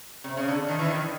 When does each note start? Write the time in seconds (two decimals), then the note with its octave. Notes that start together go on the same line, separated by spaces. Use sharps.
0.24 C3
0.37 C#3
0.48 D3
0.68 D#3
0.79 E3
0.88 D#3